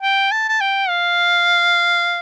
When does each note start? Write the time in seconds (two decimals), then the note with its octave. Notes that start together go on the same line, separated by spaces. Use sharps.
0.03 G5
0.32 A5
0.49 A5
0.61 G5
0.89 F5